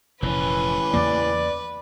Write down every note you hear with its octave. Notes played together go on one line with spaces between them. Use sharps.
F1 A#2 E3 C#4 B4
E2 C#3 A#3 D5